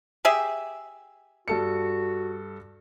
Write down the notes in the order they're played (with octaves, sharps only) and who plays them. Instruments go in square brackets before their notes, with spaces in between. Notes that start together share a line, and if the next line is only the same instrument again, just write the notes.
[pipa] G4 G#4 E5
[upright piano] G2 A4 C#7 [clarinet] F#4